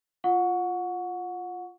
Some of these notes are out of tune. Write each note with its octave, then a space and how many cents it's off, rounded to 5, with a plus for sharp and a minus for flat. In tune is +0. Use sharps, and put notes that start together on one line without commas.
F4 +0 F#5 -25 C#6 +15